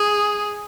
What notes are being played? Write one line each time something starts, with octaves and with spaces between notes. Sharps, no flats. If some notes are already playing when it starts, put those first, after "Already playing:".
Already playing: G#4